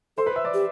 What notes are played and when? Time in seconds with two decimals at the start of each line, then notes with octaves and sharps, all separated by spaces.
0.17 A4 C5 C6
0.26 B4 B5
0.36 E5 E6
0.45 D5 D6
0.54 G4